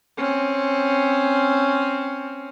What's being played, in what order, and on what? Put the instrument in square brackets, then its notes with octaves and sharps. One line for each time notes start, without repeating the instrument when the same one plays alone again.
[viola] C4 C#4